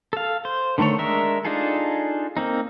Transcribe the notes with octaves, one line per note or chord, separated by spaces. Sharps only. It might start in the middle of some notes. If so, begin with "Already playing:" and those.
A4 F5
C5
D3 D#3 A3 A4 C#5
G#3 D4 A#4 E5
D4 D#4 F4 G#4 A4
A#3 C4 D#4